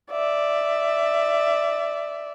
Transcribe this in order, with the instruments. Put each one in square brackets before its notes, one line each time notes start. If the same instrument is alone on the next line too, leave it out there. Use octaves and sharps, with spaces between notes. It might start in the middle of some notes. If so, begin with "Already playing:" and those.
[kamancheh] D5 E5